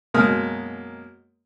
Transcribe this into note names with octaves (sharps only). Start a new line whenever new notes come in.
F#2 B2 G#3 A#3 D#6 F6